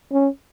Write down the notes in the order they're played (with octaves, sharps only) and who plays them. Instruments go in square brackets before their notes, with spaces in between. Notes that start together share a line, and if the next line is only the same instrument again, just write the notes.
[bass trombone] C#4